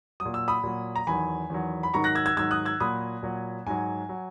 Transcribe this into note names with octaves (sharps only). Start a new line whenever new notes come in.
F#3 D#6
A#2
E6
B5 D#6
A#2 F#3
A#5
E2 D#3 F#3 G#5 B5
E2 D#3 F#3
B5
G#2 D#3 F#3 A#5 C#6
F#6 A#6
E6 G#6
E6 G#6
G#2 D#3 F#3 E6 G#6
D#6 F#6
E6 G#6
A#2 F#3 B5 D#6
A#2 F#3
G#2 F#3 G#5
F#3